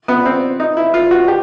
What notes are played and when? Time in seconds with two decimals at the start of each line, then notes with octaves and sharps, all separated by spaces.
0.08 B3
0.25 C4
0.60 D#4
0.77 E4
0.94 F4
1.11 F#4
1.28 G4